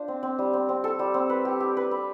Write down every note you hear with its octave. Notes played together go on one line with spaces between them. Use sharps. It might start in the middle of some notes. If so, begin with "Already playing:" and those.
Already playing: D4 F4 C5
C4
C4
G3
C4
C4
A4
G3
C4
B4
G4
G4
B4
B4